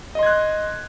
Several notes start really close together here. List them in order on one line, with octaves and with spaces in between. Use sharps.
D#5 C6 G#6 F#6